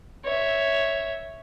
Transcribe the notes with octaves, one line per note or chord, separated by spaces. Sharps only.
C#5 E5